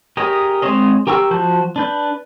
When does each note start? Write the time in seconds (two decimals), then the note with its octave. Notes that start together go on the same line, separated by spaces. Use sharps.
0.17 G4 G#4 A#4 C#5 D#5
0.62 G#3 C4 C5 C#5 D#5
1.07 G4 A#4 G5 C#6 E6
1.31 F3 F#4 A5 G6
1.76 D4 B4 G6